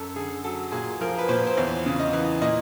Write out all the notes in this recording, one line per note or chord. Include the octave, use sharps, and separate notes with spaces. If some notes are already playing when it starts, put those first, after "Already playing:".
Already playing: F#2 A4
D3 G#4
F#3 A4
A#2 G#4
F3 A#4
B4
A#2 C5
C5
E2 C#5
C#3
D#5
E3
A#2 D#5